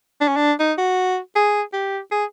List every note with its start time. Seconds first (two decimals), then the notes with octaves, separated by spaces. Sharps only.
0.21 D4
0.28 C#4
0.36 D4
0.60 D#4
0.78 F#4
1.36 G#4
1.73 G4
2.11 G#4